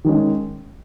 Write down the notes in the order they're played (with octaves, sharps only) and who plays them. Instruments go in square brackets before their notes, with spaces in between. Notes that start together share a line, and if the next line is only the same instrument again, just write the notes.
[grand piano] D#3 G#3 C#4